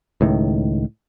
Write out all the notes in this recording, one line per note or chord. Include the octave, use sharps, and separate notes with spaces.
C#2 A2 D#3